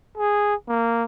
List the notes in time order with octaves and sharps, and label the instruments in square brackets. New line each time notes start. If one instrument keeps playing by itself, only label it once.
[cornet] G#4
A#3